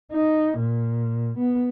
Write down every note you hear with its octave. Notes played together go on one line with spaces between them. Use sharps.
D#4
A#2
B3